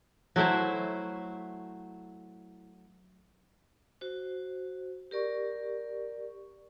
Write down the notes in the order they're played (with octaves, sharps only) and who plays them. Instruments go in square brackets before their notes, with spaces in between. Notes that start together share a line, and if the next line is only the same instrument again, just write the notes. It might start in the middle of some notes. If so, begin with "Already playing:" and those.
[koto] F#3 A3 E4 C5
[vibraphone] F#4 C5
G4 A#4 D5 C#6